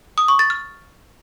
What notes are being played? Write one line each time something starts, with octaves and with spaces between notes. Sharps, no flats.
D#6
C#6
A6
F6